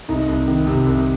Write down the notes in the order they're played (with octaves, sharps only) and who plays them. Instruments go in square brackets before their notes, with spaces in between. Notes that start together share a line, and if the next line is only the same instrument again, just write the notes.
[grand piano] C2 D#4
C2
D#3
C3
C2